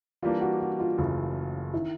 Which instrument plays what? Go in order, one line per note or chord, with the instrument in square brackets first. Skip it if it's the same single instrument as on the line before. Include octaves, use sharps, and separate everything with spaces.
[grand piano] E3 G3 A#3 D4 [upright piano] F4
[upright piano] F#4
F#4
F4
[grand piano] F#1 F#2 C#3 E3 A3
[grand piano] D#3 [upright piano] E4